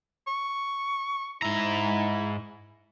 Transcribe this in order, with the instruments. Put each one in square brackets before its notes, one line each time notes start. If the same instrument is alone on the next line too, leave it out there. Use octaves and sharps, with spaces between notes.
[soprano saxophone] C#6
[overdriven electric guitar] G#2 A#5 [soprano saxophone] E4